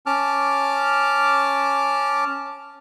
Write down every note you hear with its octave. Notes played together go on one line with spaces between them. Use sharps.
C#4 A5 D6 F6